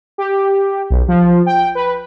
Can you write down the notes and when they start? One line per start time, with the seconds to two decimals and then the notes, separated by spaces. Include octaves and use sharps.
0.18 G4
0.90 B1
1.08 F3
1.46 G5
1.75 B4